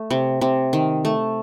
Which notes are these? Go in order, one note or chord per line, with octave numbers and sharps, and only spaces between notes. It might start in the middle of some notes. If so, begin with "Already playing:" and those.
Already playing: A3
C3
C3
D#3
A3